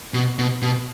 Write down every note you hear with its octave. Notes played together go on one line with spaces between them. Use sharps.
B2
B2
B2